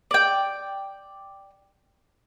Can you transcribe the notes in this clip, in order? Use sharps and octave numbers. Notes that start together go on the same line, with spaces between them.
D5 G5